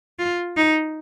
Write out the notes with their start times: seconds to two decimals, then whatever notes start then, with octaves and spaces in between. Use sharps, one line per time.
0.19 F4
0.56 D#4